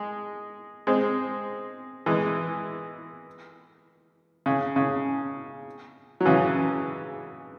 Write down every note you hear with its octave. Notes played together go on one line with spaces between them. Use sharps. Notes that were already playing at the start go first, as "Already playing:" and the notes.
Already playing: G#3
G#3 C4
E3 G#3
C#3
C#3
F#3
C#3 E3